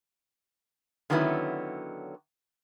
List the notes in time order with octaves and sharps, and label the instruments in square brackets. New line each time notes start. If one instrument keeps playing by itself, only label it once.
[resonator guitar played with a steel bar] D3 D#3 F#3 B3 C#4 E4